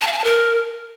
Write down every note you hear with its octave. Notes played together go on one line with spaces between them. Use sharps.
A5
F5
G#5
A5
A#4